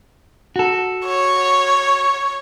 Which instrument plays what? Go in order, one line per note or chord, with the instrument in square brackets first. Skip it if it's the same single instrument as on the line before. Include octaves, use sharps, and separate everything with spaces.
[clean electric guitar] F#4 A4
[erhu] C#5